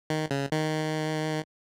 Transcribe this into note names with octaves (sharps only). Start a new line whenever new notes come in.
D#3
C#3
D#3